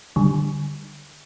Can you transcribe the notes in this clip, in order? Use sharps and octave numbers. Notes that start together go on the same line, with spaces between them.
D3 G3